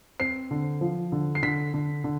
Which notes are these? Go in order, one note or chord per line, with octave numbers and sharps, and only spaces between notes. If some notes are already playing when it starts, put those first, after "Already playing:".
C4 C7
D3
F3
D3
C7
D3 B6
D3
D3